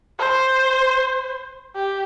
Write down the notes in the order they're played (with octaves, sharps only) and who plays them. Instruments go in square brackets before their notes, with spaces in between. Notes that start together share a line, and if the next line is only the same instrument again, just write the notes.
[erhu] C5
G4